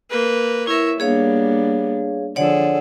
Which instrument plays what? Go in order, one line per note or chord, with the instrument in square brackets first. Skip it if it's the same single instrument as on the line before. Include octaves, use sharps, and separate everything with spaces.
[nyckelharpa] A#3 B4
[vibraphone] E4 A#4 [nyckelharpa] C#5 E5
[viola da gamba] G3 A#3 D4 [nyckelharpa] B3 [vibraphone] G#4 C#5 F5
[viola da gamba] D3 F3 [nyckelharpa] G#4 A4 [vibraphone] C#5 D5 F#5